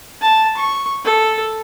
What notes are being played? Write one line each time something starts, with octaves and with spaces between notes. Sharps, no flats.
A5
C#6
A4